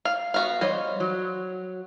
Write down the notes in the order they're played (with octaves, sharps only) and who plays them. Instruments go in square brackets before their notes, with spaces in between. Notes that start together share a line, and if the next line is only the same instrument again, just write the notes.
[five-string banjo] F5
B3 F#4 F5
[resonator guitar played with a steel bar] G3 C#5 D#5 [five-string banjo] C5
[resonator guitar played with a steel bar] F#3